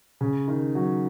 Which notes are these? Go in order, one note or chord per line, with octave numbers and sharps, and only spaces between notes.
C#3
D#3
F#3